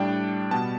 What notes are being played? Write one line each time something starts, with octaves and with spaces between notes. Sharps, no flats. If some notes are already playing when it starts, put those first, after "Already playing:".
Already playing: A2 G3 D4 G5
B2 G3 B3 A5